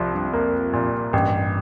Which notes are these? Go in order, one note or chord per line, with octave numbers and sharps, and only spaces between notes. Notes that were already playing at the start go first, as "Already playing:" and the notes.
Already playing: C2 F3
G2
F2 A#3
A#2
A1 G2